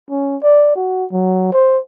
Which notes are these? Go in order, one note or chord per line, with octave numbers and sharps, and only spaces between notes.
C#4
D5
F#4
F#3
C5